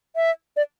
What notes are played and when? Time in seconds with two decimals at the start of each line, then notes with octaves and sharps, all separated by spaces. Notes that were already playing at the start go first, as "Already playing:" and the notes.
0.16 E5
0.57 D5